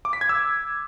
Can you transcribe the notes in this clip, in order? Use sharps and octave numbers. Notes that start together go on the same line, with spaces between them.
D6
B6
G#6
E6